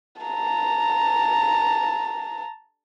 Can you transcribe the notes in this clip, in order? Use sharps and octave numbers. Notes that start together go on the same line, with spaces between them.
A5 A#5